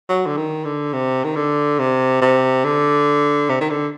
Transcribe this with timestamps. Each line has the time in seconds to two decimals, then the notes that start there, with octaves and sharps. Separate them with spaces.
0.09 F#3
0.27 D3
0.37 D#3
0.65 D3
0.93 C3
1.24 D#3
1.36 D3
1.79 C3
2.21 C3
2.65 D3
3.50 C3
3.61 D#3
3.70 D3